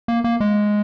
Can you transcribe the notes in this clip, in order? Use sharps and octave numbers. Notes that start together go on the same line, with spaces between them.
A#3
A#3
G#3